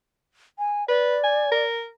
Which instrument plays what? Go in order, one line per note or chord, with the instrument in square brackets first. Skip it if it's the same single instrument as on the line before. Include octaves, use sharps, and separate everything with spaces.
[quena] G#5
[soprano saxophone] B4 [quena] D5
[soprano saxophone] G#5
A#4